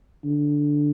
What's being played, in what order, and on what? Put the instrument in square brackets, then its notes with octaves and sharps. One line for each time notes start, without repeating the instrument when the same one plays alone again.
[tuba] D3